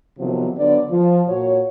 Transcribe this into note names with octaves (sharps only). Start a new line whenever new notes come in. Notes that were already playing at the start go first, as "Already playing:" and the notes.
C3 D#3 F3 F#3 B3
D3 F#3 B3 D5
F3
A#2 F#4 C#5